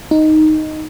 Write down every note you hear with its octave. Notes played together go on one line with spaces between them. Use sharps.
D#4